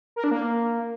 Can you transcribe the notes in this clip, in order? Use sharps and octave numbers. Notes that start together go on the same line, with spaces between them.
A#4
D4
A#3